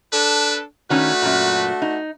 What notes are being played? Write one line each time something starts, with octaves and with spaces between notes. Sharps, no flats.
D4 A4 B4
D#3 A3 C#4 D4 F#4 B4
F#2 A#2
D#4